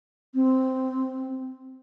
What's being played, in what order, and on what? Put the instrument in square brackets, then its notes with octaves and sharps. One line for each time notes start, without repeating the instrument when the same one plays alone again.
[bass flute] C4